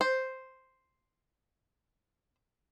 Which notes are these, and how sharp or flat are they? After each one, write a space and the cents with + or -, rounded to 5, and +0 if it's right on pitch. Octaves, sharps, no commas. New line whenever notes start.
C5 +0